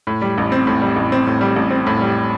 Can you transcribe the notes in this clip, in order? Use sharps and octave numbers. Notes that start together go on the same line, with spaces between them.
A2
G3
A1
C4
A2
G3
A1
C4
A2
G3
A1
C4
A2
G3